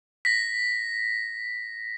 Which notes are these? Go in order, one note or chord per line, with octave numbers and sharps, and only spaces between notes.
A#6 B6